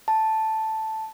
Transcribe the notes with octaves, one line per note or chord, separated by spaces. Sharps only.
A5